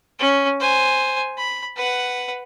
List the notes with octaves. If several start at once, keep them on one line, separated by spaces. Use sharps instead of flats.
C#4
C5 G#5
B5
B4 F#5